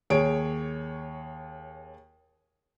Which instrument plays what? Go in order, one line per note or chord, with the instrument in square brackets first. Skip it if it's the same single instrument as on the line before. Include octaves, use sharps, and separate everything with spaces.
[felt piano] D#2 G#4 C#5 D7